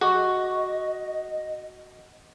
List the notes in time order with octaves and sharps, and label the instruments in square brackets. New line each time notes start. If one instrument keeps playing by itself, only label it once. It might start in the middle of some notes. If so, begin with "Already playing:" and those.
[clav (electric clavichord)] F#4 [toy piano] G#4 C#6 [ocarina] D#5